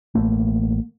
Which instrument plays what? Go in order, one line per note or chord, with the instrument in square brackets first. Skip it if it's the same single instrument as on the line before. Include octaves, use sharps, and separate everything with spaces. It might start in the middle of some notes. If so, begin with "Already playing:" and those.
[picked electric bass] A1 A3 A#3